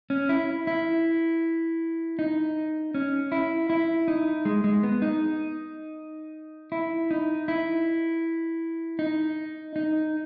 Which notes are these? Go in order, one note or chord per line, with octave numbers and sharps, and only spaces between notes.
C#4
E4
E4
D#4
C#4
E4
E4
D#4
G#3
G#3
B3
D#4
E4
D#4
E4
D#4
D#4